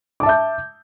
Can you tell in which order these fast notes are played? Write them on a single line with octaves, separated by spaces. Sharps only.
D6 A5 E5 G6